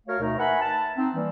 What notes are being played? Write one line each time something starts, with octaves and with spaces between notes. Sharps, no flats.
A3 F#4 A#4 C#5 F5
D2 B2 A3 D#4 A#4
B4 E5 F#5 G#5 A#5 B5
A5
C4 D#4
E3 G3 A#3